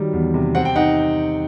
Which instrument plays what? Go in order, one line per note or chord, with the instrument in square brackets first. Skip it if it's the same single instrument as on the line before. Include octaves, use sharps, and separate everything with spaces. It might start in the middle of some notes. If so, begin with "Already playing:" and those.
Already playing: [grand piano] D#3 F#3 G3
E2
C3
C4 F#5
G5
D#4 F#5